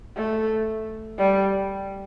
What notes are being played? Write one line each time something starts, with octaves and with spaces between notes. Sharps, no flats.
A3
G3